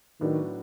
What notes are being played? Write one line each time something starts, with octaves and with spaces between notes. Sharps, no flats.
A2 D#3 F#3 B3 D4 F#4